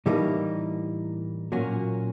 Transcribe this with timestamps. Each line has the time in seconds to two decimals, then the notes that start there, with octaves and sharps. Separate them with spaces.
0.06 A2 E3 G3 A#3 D#4
1.52 A#2 F#3 A#3 C#4 F#4